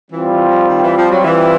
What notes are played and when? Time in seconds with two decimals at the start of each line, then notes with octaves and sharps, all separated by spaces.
0.10 E3 G3 C4 F4
0.30 E3
0.48 F3
0.67 D#3
0.82 E3
0.95 F3
1.10 F#3
1.23 E3